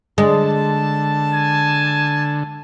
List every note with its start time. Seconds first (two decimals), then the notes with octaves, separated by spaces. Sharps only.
0.18 D3 G#3 A5
1.33 G#5